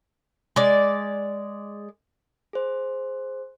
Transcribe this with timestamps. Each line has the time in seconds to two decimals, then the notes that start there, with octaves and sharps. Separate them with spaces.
0.56 G#3 D5
2.53 G#4 C5